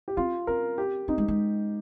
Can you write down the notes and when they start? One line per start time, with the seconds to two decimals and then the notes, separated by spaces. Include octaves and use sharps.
0.08 G4
0.17 C4 F4
0.47 C4 A#4
0.78 G4
1.08 C4 D#4
1.18 G#3
1.28 G#3